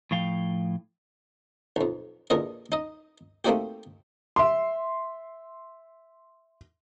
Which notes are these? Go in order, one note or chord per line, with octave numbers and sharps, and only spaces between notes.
A2 F3 F5 G5
B1 F2
A#1 E2 D3 A#4 D#5
D#4 D#5
A3 A#3 C4 D#4 F#4 G4
E5 C6